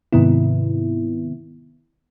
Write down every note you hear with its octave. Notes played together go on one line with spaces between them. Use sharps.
G#2 C3 D#3 B3 E4